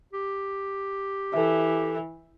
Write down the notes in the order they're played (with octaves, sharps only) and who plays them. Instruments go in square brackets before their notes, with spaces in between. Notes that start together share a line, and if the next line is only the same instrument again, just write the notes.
[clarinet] G4
[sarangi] E3 [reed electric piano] A4 E5